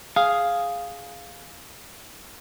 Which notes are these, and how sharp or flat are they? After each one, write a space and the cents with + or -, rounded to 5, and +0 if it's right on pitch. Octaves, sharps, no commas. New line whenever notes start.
G#4 +0 F5 +0